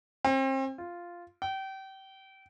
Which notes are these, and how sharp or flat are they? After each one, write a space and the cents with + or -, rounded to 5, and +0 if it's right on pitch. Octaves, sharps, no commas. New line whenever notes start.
C4 +35
F4 -5
G5 -30